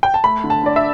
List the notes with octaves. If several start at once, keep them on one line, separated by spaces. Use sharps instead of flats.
G5
A5
A3 B5
D3
A5
D3 D5
E5